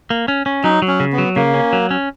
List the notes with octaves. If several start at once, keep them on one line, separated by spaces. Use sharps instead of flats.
A#3
C#4
C#4
F#3 D#4
F#3
C#4
C#3
B3
F#3
C#3 A#3
C#4
F#3
C#4